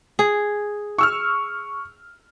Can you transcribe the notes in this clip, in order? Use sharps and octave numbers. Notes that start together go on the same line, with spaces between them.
G#4
C#6 E6 F6